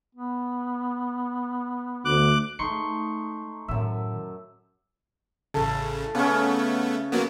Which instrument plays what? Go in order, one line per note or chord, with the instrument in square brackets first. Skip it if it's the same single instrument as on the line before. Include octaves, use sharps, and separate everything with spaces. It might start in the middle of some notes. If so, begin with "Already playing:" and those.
[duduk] B3
[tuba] D2 [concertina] D6 F#6
[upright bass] G#3 [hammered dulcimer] A3 D#4 [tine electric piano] C6 C#6 C#7
[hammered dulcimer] F#2 E5 [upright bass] A2 D#3
[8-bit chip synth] A1 C#3 [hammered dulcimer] A4
[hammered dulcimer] C#3 C#4 [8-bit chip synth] A3 B3
[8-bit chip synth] F#3 A#3 B3